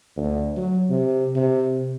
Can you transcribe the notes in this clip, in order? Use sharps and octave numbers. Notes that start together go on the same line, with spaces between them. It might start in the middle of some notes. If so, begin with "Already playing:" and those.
D2
F#3
C3
C3